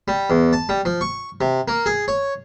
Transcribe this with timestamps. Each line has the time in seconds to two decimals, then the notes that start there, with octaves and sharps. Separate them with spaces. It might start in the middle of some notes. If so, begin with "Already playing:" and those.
0.08 G3
0.30 E2
0.53 A5
0.69 G3
0.85 F3
1.01 C#6
1.41 C3
1.68 A#3
1.86 G#4
2.08 C#5